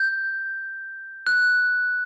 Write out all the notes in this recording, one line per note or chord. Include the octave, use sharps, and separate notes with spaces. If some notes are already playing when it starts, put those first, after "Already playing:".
Already playing: G6
F#6